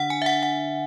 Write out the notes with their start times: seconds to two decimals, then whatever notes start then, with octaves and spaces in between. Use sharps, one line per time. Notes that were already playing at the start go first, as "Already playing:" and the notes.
Already playing: D3 D4 F#5
0.10 G#5
0.22 E5
0.26 F#5
0.43 F#5